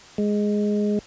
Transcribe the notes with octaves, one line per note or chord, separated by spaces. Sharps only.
G#3